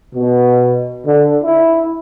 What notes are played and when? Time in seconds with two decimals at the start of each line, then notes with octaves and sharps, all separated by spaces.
0.14 B2
1.06 D3
1.43 E4